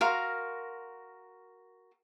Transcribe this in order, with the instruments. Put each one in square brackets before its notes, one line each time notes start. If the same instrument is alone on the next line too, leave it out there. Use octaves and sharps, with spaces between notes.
[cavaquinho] F#4 A#4 F5 C6